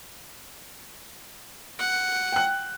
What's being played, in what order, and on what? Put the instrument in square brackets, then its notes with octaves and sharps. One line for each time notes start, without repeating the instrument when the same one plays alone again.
[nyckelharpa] F#5
[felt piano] G5 F#6